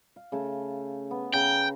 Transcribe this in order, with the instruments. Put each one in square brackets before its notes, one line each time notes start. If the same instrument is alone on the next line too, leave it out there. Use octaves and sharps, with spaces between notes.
[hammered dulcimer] F5
C#3 A3 A5
B3
[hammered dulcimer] C#3 A4 A#5 [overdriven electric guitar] G5